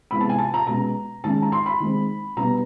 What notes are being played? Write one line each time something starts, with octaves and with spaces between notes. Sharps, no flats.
C3 E3 G#3 B3 B5
A5
G#5
A5
A#5
B2 G#3 C#4 A#5
D#3 G#3 C#4 A5
A#5
C6
B5
D#3 G#3 C4
B2 G3 B3 D4 A#5